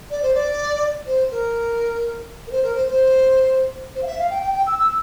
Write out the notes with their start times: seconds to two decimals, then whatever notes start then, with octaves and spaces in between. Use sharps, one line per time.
0.10 D5
0.22 C5
0.34 D5
1.06 C5
1.30 A#4
2.46 A#4
2.51 C5
2.63 A#4
2.75 C5
2.87 C5
3.95 C5
4.02 F5
4.06 E5
4.18 F5
4.30 G5
4.42 G5
4.54 G5
4.66 E6
4.78 E6